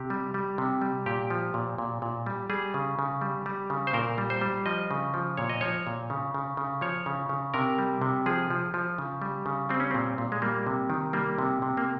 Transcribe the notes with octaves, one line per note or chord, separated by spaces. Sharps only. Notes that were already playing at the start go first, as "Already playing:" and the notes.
Already playing: C3 G4
G3
G3
C3
G3
A#2 G4
F3
A#2
A#2
A#2
G3
G3 G#4
C#3
C#3
G3
G3
C#3
C5
A#2 A#4
G3
C5
G3
F3 D#5
C#3
F3
A#2 C#5
D#5
F3 C#5
A#2
C#3
C#3
C#3
F3 C#5
C#3
C#3
C3 A#4
G3
C3
F3 G#4
F3
F3
C#3
G3
C#3
G3 C4
C#4
A#2 C4
A#2
G#3
G3 A#3
C3
D#3
G3 A#3
C3
C3
A#3